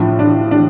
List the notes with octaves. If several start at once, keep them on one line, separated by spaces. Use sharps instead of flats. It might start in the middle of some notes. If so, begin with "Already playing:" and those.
Already playing: A2 F3 D4
D4
D4